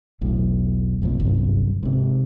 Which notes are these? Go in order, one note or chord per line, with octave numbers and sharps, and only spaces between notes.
E1 B1 A2
F1 A#1 F2 A#2
D1 G1 C2 F#2
G#2 C3